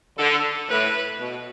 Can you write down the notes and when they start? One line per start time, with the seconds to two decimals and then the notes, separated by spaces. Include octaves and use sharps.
0.18 D3 A4
0.69 A2 B4
1.19 B2